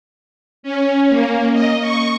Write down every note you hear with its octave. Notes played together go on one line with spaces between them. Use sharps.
C#4
A#3
D#5
C#6